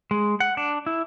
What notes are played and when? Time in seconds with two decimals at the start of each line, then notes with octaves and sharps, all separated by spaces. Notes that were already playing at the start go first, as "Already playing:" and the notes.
0.11 G#3
0.40 F#5
0.57 D4
0.86 E4